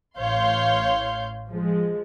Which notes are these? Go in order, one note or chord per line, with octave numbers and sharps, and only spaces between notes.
A1 C#5 F5 C6 G6
F3 G#3